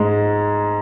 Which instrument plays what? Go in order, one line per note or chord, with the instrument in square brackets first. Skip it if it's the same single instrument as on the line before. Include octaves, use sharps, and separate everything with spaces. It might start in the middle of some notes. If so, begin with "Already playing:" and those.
Already playing: [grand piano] G#2 G#3